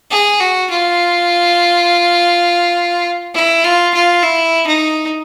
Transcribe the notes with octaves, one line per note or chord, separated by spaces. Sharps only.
G#4
F#4
F4
E4
F4
F4
E4
D#4